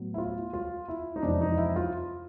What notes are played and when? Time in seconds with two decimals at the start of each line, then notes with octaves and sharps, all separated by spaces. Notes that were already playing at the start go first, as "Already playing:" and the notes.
Already playing: A2 F#3 B3
0.14 E4
0.18 F4
0.53 F4
0.88 E4
1.16 D#4
1.22 F2 C3 E3 G#3 D4
1.41 D#4
1.58 E4
1.76 F4